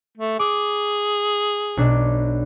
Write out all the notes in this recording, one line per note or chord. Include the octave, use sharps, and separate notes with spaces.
A3
G#4 D6
B1 D4